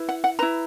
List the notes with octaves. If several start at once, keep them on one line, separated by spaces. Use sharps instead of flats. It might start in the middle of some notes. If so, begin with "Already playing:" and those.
Already playing: E4 B4
F#5
F#5
E4 B4 A#5